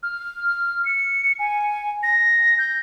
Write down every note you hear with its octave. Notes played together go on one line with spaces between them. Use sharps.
F6
C#7
G#5
A#6
G6